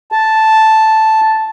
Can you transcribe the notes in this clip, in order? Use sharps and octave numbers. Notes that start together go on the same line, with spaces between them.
A5